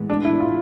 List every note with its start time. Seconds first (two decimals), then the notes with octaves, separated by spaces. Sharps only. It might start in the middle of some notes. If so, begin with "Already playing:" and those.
Already playing: A2 E3 G#3 B3
0.10 D4
0.25 E4
0.40 F4